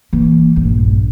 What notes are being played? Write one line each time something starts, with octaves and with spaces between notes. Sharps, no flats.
E3 A#3
A#1 G2